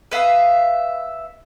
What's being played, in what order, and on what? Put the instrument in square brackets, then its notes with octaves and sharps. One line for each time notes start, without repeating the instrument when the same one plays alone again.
[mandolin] B4 E5 F5 D#6